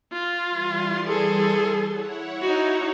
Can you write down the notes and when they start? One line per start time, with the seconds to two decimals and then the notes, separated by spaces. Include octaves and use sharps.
0.13 F4
0.49 E3 G3 C6
1.08 G#4 A4
1.89 E4 C#5 F#5
2.42 D#4 F#4